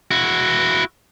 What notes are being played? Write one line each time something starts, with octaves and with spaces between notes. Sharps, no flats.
E4 F#4